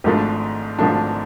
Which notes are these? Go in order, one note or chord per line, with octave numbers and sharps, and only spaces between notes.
G#1 G#2 F3 A3 D4
G#1 G#2 F3 A3 D4